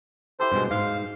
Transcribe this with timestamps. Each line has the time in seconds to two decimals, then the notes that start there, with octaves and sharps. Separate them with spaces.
0.40 E4 G4 A4 C5
0.52 G2 B2 G#3
0.71 G#2 F5